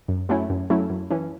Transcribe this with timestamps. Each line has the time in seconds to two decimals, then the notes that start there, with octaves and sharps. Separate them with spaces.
0.08 F#2
0.29 F#3 A3 C#4 E4
0.50 F#2
0.70 F#3 A3 C#4 E4
0.90 F#2
1.11 E3 C#4